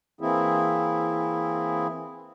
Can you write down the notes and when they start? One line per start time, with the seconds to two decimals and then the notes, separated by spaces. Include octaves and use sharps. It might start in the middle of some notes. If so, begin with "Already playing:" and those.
0.21 E3 A#3 C4 E4 G#4